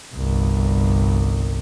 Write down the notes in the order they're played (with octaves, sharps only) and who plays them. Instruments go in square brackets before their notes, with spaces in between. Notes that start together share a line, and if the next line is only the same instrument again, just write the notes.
[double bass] G1 C2